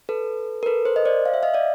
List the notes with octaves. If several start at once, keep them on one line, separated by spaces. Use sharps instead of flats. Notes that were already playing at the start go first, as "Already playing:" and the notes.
A4 B4
A#4
A4 B4
A#4 C5
D#5
C5 D5
F5
E5
D#5 F5
D5 E5